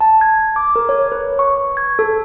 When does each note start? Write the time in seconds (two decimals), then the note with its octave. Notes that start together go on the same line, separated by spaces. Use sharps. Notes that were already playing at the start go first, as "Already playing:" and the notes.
0.01 A5
0.21 G#6
0.56 D6
0.76 A#4
0.89 C#5
1.12 B4
1.39 C#6
1.77 G#6
1.99 A4